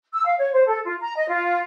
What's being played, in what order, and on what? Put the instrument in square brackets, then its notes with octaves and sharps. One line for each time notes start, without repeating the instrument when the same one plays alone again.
[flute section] E6
F5
C#5
C5
A4
F4
A#5
D#5
F4